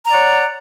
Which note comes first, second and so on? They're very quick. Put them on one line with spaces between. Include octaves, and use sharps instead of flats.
A#5 D5 C#5 F#5